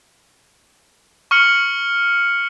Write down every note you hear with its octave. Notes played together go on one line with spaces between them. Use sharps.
C#6 F6 C#7 F#7